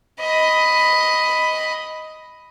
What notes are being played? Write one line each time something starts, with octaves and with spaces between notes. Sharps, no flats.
D#5 B5